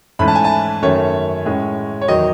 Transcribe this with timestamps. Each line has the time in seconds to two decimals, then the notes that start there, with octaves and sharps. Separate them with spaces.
0.19 G#2 E3 A3 C#4 B5
0.28 A5
0.35 G#5
0.44 A5
0.82 F#2 D#3 A3 C#4 C#5
1.45 A2 G#3 C#4
2.01 C#5
2.08 E2 D#3 F#3 D#5